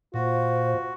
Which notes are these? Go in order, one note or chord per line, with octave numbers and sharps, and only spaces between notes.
A#2 F4 F#4 C5